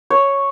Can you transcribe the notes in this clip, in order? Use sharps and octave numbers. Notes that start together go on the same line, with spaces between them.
C#5